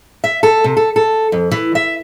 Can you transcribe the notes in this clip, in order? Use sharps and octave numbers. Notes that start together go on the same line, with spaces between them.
E5
A4
C3
A4
A4
F2
E3
E5